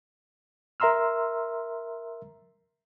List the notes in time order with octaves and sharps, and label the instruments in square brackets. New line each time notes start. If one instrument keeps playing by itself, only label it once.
[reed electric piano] A#4 E5 A#5 C6 E6 F6